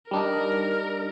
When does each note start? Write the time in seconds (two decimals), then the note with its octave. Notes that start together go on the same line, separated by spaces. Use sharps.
0.11 G3 D4 D#4 A#4